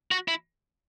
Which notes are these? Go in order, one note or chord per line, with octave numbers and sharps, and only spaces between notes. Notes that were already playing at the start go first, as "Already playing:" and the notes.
F#4
E4